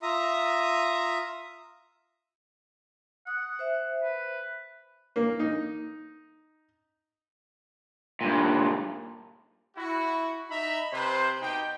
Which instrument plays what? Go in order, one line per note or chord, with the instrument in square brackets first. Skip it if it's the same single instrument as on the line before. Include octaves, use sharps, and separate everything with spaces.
[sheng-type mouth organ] F4 E5 A#5 D#6
[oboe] F#5 [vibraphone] D#6
[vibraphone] C5 E5
[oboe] B4
[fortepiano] A#3
D#4
[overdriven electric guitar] G2 A#2
[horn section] E4 F#4
D#4 E5 A#5 B5
C3 B4 C5
B2 D#4 G4 G5